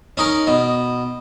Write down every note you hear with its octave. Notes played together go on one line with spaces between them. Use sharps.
C#4 D#4 A#4
B2